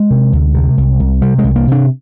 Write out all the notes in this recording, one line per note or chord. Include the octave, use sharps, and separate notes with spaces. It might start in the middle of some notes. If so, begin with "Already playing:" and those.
Already playing: G#3
C3
D2
C3
C2
C2
C3 G3
G#3
C2
A#3
C3 D4